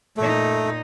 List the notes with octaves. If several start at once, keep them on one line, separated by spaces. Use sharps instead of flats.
A#2 A3 D#4